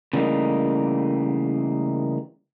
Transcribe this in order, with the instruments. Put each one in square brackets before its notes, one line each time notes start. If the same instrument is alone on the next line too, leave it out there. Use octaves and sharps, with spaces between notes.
[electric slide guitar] C#3 E3 G3 A3 A#3 D#4